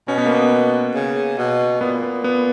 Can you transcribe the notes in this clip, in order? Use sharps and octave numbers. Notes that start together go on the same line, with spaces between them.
B2 C#4
B3
A#3
B3
C#3
B2
A#2 B3
B3
B3